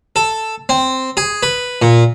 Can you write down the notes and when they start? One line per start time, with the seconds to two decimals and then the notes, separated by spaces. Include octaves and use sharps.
0.16 A4
0.69 C4
1.17 G#4
1.43 B4
1.82 A#2